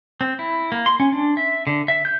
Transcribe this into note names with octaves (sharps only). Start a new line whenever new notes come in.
C4
E4
A#3
C6
C#4
D4
E5
D3
E5
G6